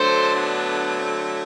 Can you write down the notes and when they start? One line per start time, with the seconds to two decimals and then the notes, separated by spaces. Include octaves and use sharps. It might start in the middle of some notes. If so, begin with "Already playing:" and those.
Already playing: D3 F#3 A3 A4 C5
0.33 B3 D4
0.96 C4